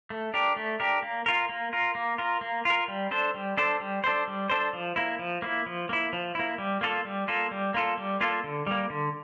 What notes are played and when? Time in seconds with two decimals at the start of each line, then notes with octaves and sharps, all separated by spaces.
0.10 A3
0.34 D4 G4 A#4
0.56 A3
0.80 D4 G4 A#4
1.02 A#3
1.26 F4 A#4
1.49 A#3
1.73 F4 A#4
1.95 A#3
2.18 F4 A#4
2.41 A#3
2.65 F4 A#4
2.88 G3
3.11 D4 A4 C5
3.34 G3
3.57 D4 A4 C5
3.80 G3
4.04 D4 A4 C5
4.28 G3
4.50 D4 A4 C5
4.73 F3
4.96 A#3 E4
5.19 F3
5.42 A#3 E4
5.66 F3
5.89 A#3 E4
6.13 F3
6.35 A#3 E4
6.58 G3
6.81 A#3 F4 A4
7.05 G3
7.28 A#3 F4 A4
7.51 G3
7.74 A#3 F4 A4
7.97 G3
8.21 A#3 F4 A4
8.44 D3
8.67 G3 A#3
8.90 D3